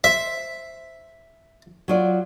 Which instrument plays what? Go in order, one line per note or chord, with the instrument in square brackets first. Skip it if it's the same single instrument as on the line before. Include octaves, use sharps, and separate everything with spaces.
[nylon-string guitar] C5 [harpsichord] E5
[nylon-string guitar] F#3 F4 D5